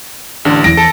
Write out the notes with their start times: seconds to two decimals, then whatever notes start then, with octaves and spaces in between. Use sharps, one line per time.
0.45 A1 D3
0.64 E2 E3 A#6 D7
0.77 A4